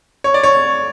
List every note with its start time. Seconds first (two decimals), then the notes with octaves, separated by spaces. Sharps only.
0.24 C#5
0.34 D5
0.43 C#5